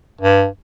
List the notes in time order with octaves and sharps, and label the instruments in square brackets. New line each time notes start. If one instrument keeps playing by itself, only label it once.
[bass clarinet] G2